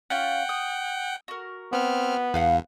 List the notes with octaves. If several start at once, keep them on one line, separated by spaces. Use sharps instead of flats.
C#4 F4 F#5 G5
D#6
F#4 A#4
B3 C4 F6
E2 B4 F5 F#5